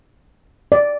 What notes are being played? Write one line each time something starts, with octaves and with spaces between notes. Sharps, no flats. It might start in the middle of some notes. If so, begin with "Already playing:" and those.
D5